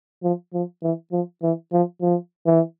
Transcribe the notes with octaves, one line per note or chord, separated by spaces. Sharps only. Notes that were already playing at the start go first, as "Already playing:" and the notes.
F3
F3
E3
F3
E3
F3
F3
E3